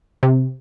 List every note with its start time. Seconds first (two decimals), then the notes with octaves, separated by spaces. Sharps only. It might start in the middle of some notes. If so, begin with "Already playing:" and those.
0.23 C3